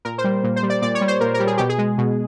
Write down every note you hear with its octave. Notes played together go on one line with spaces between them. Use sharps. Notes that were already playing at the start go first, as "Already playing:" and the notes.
A#2 A#4
C5
G3
A#2
C5
G3
D5
A#2 D5
C#5
G3
C5
A#2 A#4
A#4
G3
G#4
B2 G4
G#4
G#3
B2